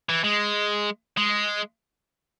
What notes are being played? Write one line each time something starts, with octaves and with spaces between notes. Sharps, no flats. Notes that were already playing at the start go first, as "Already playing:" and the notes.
E3
G#3
G#3